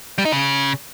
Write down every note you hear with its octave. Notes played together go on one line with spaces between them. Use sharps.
G3
D#4
C#3